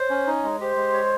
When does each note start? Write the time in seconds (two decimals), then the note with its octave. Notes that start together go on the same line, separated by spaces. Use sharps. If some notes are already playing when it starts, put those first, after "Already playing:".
Already playing: C5 C#5
0.10 C#4
0.27 D#4
0.43 G#3
0.61 G4 C5
0.76 G#3
0.94 C#5